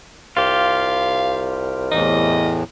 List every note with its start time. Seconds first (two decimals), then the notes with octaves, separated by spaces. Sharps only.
0.37 C2 F4 G4 F5
1.91 E2 A2 E3 D#5